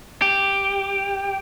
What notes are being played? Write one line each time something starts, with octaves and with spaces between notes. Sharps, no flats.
G4